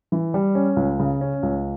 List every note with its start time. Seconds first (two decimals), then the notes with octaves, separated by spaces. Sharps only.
0.12 E3
0.34 G3
0.55 C#4
0.76 C#2
0.99 C#3
1.21 C#4
1.43 C#2